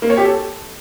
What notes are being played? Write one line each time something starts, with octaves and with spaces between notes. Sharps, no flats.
A#3
C#5
G4
A4